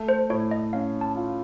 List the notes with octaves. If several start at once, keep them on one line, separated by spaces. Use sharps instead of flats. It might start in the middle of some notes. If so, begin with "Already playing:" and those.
Already playing: A3
C5
A2 C#5
D#5
C#4 F5
A5
F4